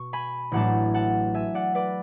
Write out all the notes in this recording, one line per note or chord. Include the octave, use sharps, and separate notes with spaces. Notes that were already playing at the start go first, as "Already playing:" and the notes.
Already playing: B2 B3 C#6
G#5 B5
A1 A2 F#3 A3 D4 F#5 A5
F#5 A5
E5 G#5
D5 F#5
B4 D5